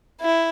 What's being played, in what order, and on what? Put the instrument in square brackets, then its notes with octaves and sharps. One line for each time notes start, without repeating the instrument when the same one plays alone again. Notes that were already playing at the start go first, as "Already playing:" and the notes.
[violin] E4